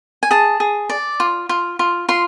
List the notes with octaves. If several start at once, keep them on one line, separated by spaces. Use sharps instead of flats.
G#5
G#4 A5
G#4
D5
F4
F4
F4
F4 C6